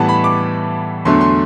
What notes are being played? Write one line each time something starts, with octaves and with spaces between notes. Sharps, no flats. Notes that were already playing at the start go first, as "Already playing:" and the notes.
Already playing: A2 E3 G3 B3 F#5 A5
B5
D6
E2 D3 F#3 A3 C6
C6